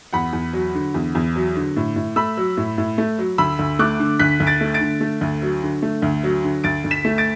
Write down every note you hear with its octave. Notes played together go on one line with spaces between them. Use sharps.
E2 F#5 B5
E2
F#3
D3
E2
E2
F#3
D3
A2
A2
A3 B5 E6
F#3
A2
A2
A3
F#3
D2 B5 E6
D2
A3 D6 F#6
D3
D2 F#6 B6
D2
A6 D7
A3
A6 D7
D3
A3
D2
F#3
D3
A3
D2
F#3
D3
D2 A6 D7
D2
B6 E7
A3
A6 D7